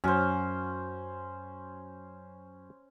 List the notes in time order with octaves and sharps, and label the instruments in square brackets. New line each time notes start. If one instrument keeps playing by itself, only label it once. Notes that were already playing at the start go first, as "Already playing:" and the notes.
[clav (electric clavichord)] F#2 F#3 [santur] C#4 C5